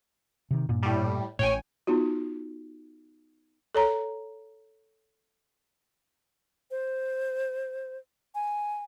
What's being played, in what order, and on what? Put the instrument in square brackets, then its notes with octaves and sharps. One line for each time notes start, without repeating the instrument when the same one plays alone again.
[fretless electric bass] C3 D#3
G2 A#2
[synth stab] A2 G3
[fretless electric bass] A1 A2 [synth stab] C#5 G5 G#5
[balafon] B3 D#4 F4 F#4
A4 C#5 A#5
[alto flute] C5
G#5